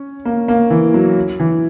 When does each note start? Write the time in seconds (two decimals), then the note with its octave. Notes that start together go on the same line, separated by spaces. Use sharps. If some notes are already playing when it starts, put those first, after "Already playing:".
Already playing: C#4
0.25 A#3
0.48 A#3
0.70 E3
0.94 F#3
1.40 E3